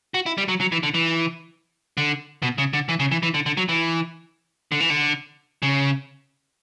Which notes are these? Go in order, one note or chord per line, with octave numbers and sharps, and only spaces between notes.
F#4
E4
G3
F#3
F#3
E3
D3
E3
D3
B2
C#3
D3
E3
C#3
E3
E3
D3
D3
F#3
E3
D3
E3
D3
C#3